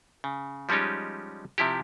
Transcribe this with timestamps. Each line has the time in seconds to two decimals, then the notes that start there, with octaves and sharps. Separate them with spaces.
0.24 C#3
0.69 F3 G3 G#3 C#4 D#4 G4
1.58 C3 F3 E4 G4